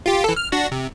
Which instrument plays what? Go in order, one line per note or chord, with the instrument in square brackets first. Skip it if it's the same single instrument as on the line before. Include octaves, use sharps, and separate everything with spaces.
[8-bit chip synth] F4 G4
E3 A4
F6
D4 F#4 A#6
C3